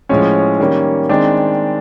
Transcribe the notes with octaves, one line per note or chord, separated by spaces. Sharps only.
A2 F3 G#3 C#4 C#5
D#3 G3 A#3 C#4
D#3 G#3 C4 D4 D5